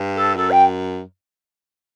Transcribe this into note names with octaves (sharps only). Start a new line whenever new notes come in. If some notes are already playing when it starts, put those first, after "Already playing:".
Already playing: G2
A4
F#2 A4
G5